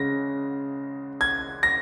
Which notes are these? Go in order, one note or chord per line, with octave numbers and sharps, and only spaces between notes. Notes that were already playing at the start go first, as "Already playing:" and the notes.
Already playing: C#3 G#3 A#6
G#6
A#6